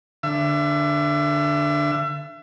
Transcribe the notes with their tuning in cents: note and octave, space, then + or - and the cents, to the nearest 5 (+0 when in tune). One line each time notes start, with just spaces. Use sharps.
D3 +0 E5 +35